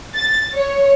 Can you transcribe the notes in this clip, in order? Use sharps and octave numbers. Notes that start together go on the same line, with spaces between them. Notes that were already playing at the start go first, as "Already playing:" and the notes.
A6
C#5